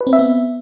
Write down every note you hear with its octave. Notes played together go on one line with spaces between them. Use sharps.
B4
C4
E5
B3